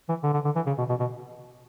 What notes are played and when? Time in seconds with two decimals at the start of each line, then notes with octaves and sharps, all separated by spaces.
0.09 E3
0.23 D3
0.33 D3
0.45 D3
0.55 E3
0.66 C#3
0.78 B2
0.89 B2
1.00 B2